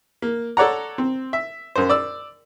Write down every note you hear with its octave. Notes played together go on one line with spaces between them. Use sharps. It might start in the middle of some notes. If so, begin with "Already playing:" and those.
A#3
A4 C#5 D5 F#5 A#5
C4
E5
F#2 C5
D5 E6